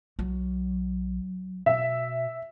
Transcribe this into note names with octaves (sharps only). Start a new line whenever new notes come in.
B1 F#3
B2 E5